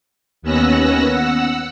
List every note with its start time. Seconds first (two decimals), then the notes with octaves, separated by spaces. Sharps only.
0.42 D#2 B3 C#4 E6 F#6 A#6
1.13 F#5 E6